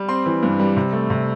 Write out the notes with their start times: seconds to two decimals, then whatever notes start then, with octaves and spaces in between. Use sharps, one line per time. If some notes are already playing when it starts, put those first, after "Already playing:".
Already playing: G3
0.09 C4 C6
0.26 E3
0.43 G2
0.60 G3
0.77 C3
0.93 A3
1.10 C3